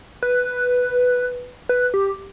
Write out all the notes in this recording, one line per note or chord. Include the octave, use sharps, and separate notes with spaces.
B4
B4
G4